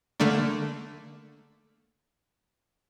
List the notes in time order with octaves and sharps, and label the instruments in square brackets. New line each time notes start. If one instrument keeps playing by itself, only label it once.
[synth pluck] D3 A3 A#3 D4